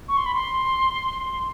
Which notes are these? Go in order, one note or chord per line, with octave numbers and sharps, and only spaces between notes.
C#6
C6
B5
C6